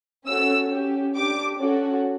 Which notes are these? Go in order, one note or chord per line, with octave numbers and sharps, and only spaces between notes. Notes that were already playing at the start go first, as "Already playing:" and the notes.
C#4 F#4 A4 E6
C#4 G4
D4 G4 D6
C#4 F#4 A4